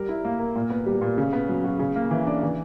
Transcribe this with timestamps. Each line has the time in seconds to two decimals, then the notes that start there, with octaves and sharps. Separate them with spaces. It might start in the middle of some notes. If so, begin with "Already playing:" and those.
Already playing: G3 A#4
0.09 E4
0.25 A#3
0.39 A#4
0.56 A#2
0.70 B3
0.86 G3
1.02 A#2
1.18 C#3
1.33 B3
1.49 F#3
1.64 F#4
1.79 C#3
1.96 A#3
2.11 E3
2.27 D4
2.43 E3